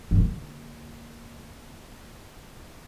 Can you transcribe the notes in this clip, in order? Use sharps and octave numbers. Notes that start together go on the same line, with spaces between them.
D3 A#3